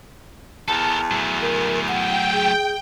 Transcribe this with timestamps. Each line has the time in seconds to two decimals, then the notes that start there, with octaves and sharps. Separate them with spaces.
0.68 E2 A4 A#4 A5
1.11 F#3 A3
1.41 A#4
1.88 F#5 G5
2.33 G#4